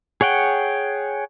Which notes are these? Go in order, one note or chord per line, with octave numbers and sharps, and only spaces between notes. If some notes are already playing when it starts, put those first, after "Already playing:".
G#4 C#5 F#5 G5